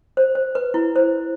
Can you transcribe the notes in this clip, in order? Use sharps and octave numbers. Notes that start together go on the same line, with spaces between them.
C5
C5
B4
E4
C5